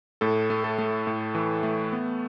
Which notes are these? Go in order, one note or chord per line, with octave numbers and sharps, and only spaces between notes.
A2 A4
A3
A4
A3
A2
E3
A3
B3